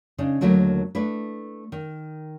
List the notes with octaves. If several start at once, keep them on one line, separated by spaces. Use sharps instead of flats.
C#3 D4 D#4
D#2 D3 F#3 A3 E4 A#4
A3 D4 E4 B4
D#3